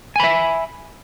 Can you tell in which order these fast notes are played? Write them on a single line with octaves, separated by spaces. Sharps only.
G#5 B5 E5